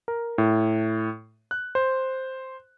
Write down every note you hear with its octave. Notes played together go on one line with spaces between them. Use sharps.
A#4
A2
F#6
C5